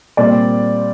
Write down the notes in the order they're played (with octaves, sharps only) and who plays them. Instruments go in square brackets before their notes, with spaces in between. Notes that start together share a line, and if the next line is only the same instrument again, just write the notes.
[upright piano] A#2 G3 C4 D5